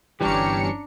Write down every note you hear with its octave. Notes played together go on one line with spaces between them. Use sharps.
G1 E3 G3 C#4 D4 G4 A#5 C#7